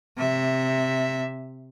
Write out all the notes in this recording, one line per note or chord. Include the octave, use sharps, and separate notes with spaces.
C3 E5